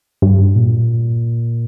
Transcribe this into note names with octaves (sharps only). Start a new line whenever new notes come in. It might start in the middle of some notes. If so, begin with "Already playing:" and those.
G2
A#2